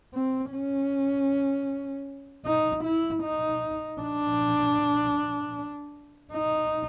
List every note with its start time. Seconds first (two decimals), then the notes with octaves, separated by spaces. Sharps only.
0.14 C4
0.53 C#4
2.46 D#4
2.84 E4
3.23 D#4
4.01 D4
6.33 D#4